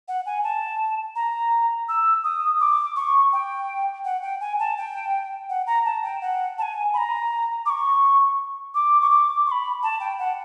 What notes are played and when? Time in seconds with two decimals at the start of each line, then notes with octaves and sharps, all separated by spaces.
0.08 F#5
0.26 G#5
0.43 A5
1.16 A#5
1.89 E6
2.24 D#6
2.60 D6
2.96 C#6
3.33 G5
4.05 F#5
4.22 G5
4.41 G#5
4.59 A5
4.77 G5
5.49 F#5
5.67 A#5
5.85 A5
6.03 G5
6.21 F#5
6.58 A5
6.62 G#5
6.94 B5
6.98 A#5
7.66 D6
7.70 C#6
8.74 D6
9.01 C#6
9.10 D6
9.46 C#6
9.51 B5
9.83 A5
10.00 G5
10.19 F#5